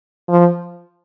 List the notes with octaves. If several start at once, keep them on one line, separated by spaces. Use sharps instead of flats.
F3